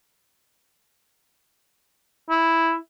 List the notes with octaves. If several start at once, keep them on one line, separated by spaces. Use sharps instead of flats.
E4